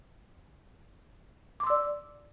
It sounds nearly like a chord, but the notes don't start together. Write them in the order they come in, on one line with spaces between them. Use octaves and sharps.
D6 C6 E6 D5